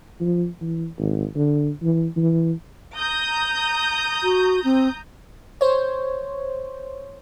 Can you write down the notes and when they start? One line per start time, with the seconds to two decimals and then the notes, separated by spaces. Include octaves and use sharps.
0.20 F3
0.61 E3
0.99 G#1
1.36 D3
1.82 E3
2.16 E3
2.95 A#5 D#6 G6
4.23 F#4
4.64 C4
5.61 C5 C#5